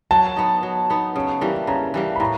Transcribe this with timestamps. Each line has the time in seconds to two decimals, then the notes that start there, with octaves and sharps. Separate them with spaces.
0.11 F#3 A5
0.37 B3 D#4
0.63 F#3
0.90 B3 D#4
1.16 C#3
1.41 E3 G3 A#3
1.67 C#3 A#5
1.94 E3 G3 A#3
2.16 B5
2.20 A2 A#5